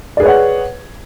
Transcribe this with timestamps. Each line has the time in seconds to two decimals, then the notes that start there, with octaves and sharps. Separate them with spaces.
0.17 D5
0.20 G#4
0.23 B4
0.26 C#5
0.28 F#5